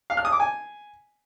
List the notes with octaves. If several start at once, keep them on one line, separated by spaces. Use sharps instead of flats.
F5
F6
D#6
D6
G#5